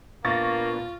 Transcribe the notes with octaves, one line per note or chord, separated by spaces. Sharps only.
A#2 A#3 B3 D4 F4 C#6 A6 A#6